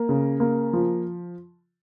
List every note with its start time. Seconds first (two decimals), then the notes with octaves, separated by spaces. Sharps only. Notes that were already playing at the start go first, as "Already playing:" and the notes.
Already playing: A#3
0.09 C#3
0.40 A#3
0.73 F3